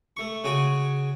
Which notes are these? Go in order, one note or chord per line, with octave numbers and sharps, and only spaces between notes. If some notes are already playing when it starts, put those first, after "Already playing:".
A3 C#6
C#3 F#4 G#5